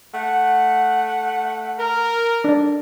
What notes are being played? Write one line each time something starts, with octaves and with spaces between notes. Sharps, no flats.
A3 F#5
A#4
D4 D5